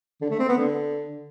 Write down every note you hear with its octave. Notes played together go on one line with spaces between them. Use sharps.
D3
A3
C4
B3
D3